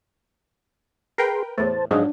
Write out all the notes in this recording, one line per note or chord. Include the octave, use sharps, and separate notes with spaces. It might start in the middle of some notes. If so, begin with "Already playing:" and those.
G#4 A#4 B4 G5 C6
E2 A2 C5 A5
G#2 F3 F#3 D4 G#4 D#5